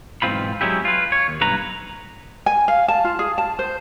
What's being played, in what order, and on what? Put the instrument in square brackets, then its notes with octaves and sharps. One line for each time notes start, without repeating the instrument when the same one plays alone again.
[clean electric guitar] B1 G#2 E3 C4 F4 B5
F#3 G#3 C#4 E4 G4
F4 B4
C#5
D#2
B1 G2 B4 A#5
[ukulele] G#5
F5
A5
F4
G#4
A5
C5